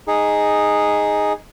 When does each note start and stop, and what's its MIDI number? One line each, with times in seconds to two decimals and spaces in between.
0.08 1.33 63
0.08 1.33 68